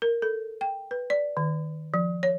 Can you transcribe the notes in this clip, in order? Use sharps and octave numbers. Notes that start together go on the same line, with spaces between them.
A#4
A4
G5
B4
D5
D#3
F3
C#5